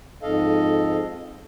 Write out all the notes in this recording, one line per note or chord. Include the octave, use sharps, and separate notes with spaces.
F2 G#2 A4 D#5 F5